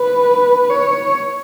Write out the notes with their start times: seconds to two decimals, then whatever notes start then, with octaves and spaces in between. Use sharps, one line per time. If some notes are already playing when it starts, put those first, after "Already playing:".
Already playing: B4
0.70 C#5